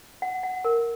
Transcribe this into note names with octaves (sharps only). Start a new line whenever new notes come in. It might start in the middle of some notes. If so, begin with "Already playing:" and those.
F#5
F#5
A#4